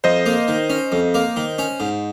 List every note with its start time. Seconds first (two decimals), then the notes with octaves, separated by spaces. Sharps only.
0.04 F2 C5 D#5
0.26 A#3
0.48 D#3
0.70 C#4
0.92 F2
1.14 A#3
1.36 D#3
1.59 C#4
1.80 G#2